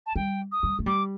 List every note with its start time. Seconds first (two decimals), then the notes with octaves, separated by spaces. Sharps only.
0.06 A5
0.16 G3 G5
0.52 D#6
0.63 G3
0.79 A3
0.86 G3 D6